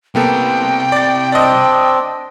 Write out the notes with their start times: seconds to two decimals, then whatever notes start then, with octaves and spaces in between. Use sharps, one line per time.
0.15 C3 G3 A#3 B3 A4 G5
0.92 D5 A6
1.32 C4 D4 D5 D#5